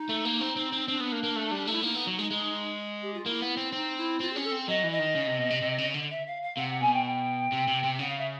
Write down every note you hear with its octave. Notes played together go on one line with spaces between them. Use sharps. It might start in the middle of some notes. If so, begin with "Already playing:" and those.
Already playing: D#4
A3
A#3
C4
C4
C4
C4 D4
B3
A#3
A#3
A3
G3
A3 E4
A#3 D#4
B3
F#3
G#3
G#3
G4
F4
A#3 E4
B3
C4
C4 D#4
E4
C4 F4
C#4 G#4
A4
C4
F#3 D#5
E3
D#5
D#3
C#3
C3
B2
C3
C3
C#3
D3
E5
F5
F5
C3 F#5
F#5
B2 G#5
G5
G5
C3
C3
C3
C#3 F#5
F5
E5